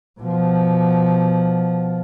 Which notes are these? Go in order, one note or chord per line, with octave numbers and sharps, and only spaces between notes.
B2 F3